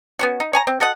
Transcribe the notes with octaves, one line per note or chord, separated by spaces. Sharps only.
B3 C#4 F#4
D#4
C#5 G#5 A#5
C4
F#4 A4 D#5 F#5